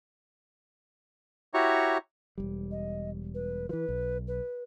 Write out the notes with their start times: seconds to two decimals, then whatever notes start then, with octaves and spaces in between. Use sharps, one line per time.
1.54 E4 F#4 G4 C#5 A#5 C#6
2.38 E1 C2 G3
2.71 D#5
3.34 B4
3.69 E3 F3 B4
3.89 B1
4.28 B4